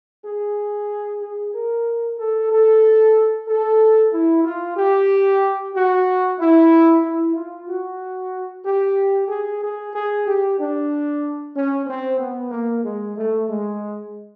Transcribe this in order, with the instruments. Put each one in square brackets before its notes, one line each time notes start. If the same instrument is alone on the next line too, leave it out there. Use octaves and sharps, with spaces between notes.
[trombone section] G#4
G#4
A#4
A4
A4
A4
E4
F4
G4
F#4
E4
E4
F4
F#4
G4
G#4
G#4
G#4
G4
D4
C#4
C4
B3
A#3
G#3
A3
G#3